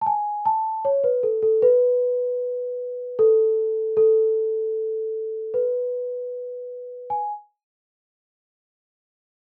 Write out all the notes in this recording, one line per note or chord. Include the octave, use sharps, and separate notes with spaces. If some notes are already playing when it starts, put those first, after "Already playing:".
A5
G#5
A5
C#5
B4
A4
A4
B4
A4
A4
B4
G#5